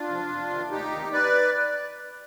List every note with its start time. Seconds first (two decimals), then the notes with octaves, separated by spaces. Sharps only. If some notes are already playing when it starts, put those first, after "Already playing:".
Already playing: D4 F4
0.08 C3 F3
0.29 F2
0.50 C3 D#3
0.71 D2 D#4 G4
0.92 C3 D#3
1.13 B4 D5